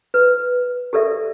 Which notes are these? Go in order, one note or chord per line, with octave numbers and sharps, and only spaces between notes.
B4
G4 A4 A#4 D5 E5